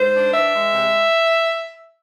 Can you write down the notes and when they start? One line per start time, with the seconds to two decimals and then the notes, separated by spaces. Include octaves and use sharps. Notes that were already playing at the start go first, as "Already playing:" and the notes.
Already playing: G#2 C5
0.13 D4
0.33 E3 E5
0.53 G#3
0.73 C3